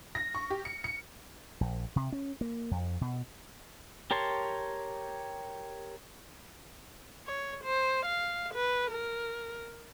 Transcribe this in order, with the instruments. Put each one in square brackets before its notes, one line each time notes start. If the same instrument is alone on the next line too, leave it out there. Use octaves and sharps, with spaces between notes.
[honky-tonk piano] A#6
C#6
G4
C#7
C#7
[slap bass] A#1
C3
C#4
A#3
F2
B2
[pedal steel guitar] G4 A#4 C#5 A5 C6
[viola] C#5
C5
F5
B4
A#4